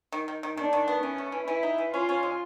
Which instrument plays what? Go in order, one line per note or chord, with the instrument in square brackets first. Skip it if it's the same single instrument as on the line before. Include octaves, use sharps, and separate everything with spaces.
[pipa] D#3
D#3
D#3
[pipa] D#3 [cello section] D4
[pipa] D#3
B3
[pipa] E3 [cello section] C#4
[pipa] A3
E3
[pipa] E3 [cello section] E4
[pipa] D#4
E3
[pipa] C#4 [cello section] F4
[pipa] C#4
G#3